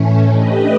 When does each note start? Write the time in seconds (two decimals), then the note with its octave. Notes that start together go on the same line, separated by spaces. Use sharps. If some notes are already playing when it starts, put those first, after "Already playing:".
Already playing: A2 E3 A3 C#4
0.32 A3 D4 G4 B4 D#5